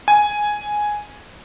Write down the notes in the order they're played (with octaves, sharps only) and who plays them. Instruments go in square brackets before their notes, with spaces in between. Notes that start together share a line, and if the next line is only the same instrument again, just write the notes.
[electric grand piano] G#5